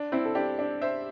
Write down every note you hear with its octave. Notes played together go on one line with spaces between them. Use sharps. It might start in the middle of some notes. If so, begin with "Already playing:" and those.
Already playing: D4
C4 E4
A4
D4 G4
D4
C5 E5